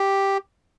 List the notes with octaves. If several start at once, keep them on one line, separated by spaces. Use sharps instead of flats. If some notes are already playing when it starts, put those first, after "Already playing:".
Already playing: G4